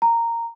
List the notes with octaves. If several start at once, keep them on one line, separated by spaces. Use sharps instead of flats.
A#5